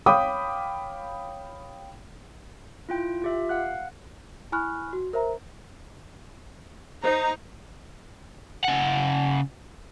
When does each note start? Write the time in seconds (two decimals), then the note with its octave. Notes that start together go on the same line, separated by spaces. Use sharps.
0.06 C#5 F5 G5 B5 D6 D#6
2.89 E4 F4 G5
3.22 F4 G4 E5
3.49 F5 F#5 F#6
4.52 E4 G#5 B5 C#6 F6 F#6
4.93 F#4
5.13 A#4 C5 E5 A#5
7.03 D#4 C5 A#5
8.64 C#3 F#5